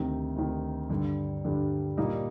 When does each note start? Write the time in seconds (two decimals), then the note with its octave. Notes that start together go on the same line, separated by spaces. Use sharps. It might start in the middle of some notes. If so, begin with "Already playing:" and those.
Already playing: D2 C3 D#3
0.36 D2 C3 D#3
0.89 G2 D3 G3
1.44 G2 D3 G3
1.97 A#2 G3 A#3 D#4